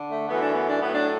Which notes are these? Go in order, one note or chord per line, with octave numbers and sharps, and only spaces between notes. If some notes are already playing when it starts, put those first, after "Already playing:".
Already playing: D3
A3
F#2 E3 A3 B3
D4
B3
D4
A2 F#3 A3 B3
D4